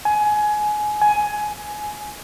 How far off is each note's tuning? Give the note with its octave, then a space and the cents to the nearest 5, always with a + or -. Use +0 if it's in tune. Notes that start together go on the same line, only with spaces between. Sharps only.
G#5 +20
G#5 +15